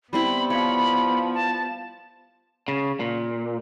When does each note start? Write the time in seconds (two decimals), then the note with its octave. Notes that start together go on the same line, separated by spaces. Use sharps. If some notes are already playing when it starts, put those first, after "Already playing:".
0.13 G3 B3 C4 E4 B5
0.50 F3 C#5 B5
1.35 A5
2.68 C#3
3.00 A#2